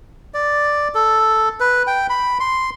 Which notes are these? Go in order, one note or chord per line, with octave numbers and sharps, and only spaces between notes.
D5
A4
B4
G5
B5
C6